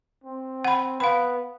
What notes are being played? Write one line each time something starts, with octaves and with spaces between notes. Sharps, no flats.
C4
F#5 B5
B3 F5 B5